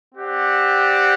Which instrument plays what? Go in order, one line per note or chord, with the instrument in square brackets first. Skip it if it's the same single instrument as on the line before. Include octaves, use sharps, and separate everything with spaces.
[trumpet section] C4 G4 D5 F#5